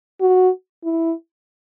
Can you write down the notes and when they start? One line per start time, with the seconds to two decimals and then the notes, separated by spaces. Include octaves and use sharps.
0.21 F#4
0.84 E4